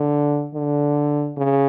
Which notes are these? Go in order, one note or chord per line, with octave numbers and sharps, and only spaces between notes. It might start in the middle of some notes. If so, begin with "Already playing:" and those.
Already playing: D3
D3
C#3